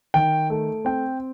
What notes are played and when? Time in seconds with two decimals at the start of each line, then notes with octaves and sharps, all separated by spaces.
0.14 D#3 G5
0.50 A3
0.85 C4 G5